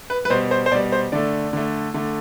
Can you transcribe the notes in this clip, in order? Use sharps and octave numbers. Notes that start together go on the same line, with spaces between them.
B4
B4
B2 G3 C5
C5
C5
B2 G3 D5
C5
D3 A3 D5
D3 A3
D3 A3